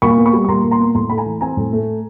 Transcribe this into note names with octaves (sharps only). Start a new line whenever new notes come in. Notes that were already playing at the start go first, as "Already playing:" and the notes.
A#2 B5 C#6
B3
B5 C#6
G3
C#6
A#2 A#5 C6
A#2
A#5 C6
B3
A2 A#5 C6
A3 B5
G#5 A#5
E3
C4 G#5 A#5
A2
A3